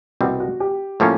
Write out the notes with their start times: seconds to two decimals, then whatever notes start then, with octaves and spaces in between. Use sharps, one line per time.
0.21 C2 B2 G3 C4 F#4
0.40 F#4
0.60 G4
1.00 A2 F3 A#3 C#4